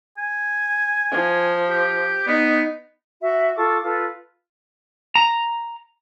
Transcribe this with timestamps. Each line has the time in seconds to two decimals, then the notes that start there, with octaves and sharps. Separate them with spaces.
0.18 G#5
1.12 F3
1.70 G4
2.27 B3 D#4
3.22 F#4 E5
3.56 F4 A4 C#6 D6
3.83 F4 A4 B4
5.15 A#5